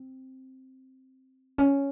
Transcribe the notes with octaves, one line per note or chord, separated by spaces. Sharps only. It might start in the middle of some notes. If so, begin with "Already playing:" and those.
Already playing: C4
C#4